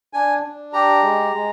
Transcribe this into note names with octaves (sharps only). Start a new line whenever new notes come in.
D4 G#5
D4
G4 A#5
G#3
G#3